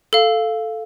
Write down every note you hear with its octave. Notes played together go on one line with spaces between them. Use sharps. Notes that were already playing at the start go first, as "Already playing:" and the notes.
A4 F5